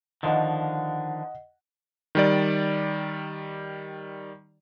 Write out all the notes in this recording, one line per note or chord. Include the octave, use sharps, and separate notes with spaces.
D3 D#3 F3 D#5 F#5
D#3 G3 D5